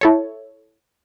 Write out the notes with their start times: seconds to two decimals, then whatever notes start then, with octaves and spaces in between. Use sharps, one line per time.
0.01 E4 A4 C#5